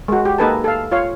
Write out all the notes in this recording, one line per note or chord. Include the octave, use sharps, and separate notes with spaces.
G#3 F#4
G4
A#3 D#4 A4 B4 G#5 A5
A4 F5
F4 C#5 F5